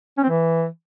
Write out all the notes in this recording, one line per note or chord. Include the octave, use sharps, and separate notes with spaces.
C#4
C4
E3